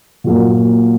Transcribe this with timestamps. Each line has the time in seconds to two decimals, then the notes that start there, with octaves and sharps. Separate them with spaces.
0.24 A#2 F#3 A#3